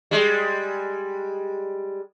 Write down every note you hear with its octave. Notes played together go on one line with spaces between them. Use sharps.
G3 G#3